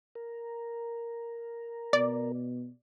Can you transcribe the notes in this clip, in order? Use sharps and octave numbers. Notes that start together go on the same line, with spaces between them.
A#4
B2 D5